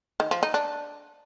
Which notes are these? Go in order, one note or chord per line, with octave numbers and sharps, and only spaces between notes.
D#3
F3
D#4
D4